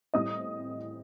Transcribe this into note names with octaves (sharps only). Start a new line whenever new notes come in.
A2 G3 C4 E4 D#5 D#6